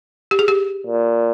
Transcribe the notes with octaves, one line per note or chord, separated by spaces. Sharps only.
G4
G#4
G4
A#2